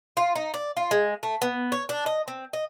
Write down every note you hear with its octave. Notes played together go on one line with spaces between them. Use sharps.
F4
D#4
D5
F4
G#3
A3
B3
C#5
D4
D#5
C4
D#5